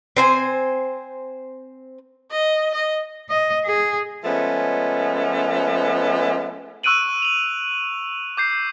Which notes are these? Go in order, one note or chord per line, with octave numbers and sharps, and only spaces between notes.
C4 C5 G#5
D#5
D#5
D#5
G#4
F3 G#3 A3 B3 C#4
C#6 E6 F#6 D7 D#7 F#7
F7 F#7
D6 G6 C7